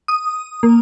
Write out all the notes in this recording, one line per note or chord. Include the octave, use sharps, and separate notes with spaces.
D#6
A#3